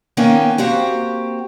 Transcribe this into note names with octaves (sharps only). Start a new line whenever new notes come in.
D#3 A#3 B3 C#4 D#4
A#3 C4 F#4 G4